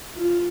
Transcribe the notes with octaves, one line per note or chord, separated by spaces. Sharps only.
F4